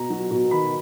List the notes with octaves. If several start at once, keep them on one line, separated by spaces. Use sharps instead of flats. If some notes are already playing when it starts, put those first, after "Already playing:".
Already playing: B2 A#5
F#3
B2
D#3 B5